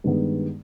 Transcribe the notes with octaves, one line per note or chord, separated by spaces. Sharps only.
G2 D#3 G#3 B3